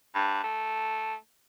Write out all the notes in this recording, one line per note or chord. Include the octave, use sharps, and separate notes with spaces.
G2
A3